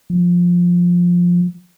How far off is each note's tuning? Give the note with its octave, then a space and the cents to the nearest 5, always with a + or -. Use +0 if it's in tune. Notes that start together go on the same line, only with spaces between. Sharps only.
F3 +10